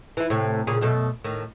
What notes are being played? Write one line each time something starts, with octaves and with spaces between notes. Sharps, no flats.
E3 E4
A2 C3
A#2 C#3 G#4
F#2 B2 A3
A2 D#3